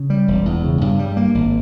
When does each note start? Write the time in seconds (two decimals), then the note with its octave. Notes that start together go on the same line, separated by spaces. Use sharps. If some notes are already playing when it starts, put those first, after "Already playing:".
Already playing: C#3
0.10 G3
0.28 E1
0.46 E2
0.64 C#3
0.81 G2
0.99 G3
1.17 A#3
1.35 G#1